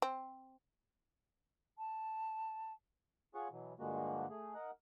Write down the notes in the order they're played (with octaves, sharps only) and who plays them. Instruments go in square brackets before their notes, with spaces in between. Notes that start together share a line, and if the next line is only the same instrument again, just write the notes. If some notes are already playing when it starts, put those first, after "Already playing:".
[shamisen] C4
[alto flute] A5
[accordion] F4 G#4 C#5 F#5 C#6
B2 E3 F#3
G2 D3 F3 G#3 A#3 F#4
A3 G#4
D#4 A#4 F#5